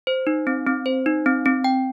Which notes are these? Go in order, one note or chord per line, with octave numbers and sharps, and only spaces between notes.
C5
D#4
C4
C4
C5
D#4
C4
C4
G5